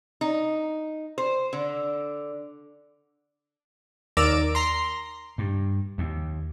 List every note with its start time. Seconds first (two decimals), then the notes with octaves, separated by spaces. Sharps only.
0.21 D#4
1.18 C5
1.53 D3
4.17 D#2 A#4 D5 D6 E6
4.55 A#5 C6
5.38 G2
5.98 D#2